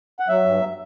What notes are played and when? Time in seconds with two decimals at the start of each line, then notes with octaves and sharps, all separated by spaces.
0.20 F#5
0.28 F#3 E5
0.45 G2